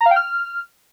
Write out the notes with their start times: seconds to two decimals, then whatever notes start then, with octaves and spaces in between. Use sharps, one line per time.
0.01 A#5
0.06 F5
0.11 G5
0.16 F6